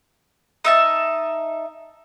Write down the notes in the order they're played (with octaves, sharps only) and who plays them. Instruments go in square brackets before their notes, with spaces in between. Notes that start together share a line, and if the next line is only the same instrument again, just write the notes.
[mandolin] D#4 E5 A5